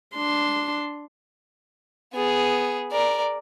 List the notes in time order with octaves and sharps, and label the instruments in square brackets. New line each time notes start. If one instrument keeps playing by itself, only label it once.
[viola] D4 C6
[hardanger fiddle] B3 G#4
A#4 D5